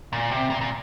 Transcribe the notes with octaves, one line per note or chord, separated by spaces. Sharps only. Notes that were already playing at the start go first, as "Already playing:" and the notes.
A#2
C3
A#2
A#2